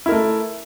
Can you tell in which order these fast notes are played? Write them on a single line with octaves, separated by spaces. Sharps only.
E4 A#4 A3